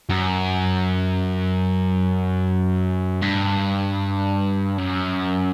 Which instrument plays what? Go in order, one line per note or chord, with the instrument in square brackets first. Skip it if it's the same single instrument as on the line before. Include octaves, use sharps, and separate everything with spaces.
[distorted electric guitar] F#2
G2
F#2